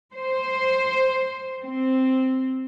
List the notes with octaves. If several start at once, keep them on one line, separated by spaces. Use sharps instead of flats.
C5
C4